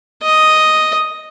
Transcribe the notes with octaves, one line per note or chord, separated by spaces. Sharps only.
D#5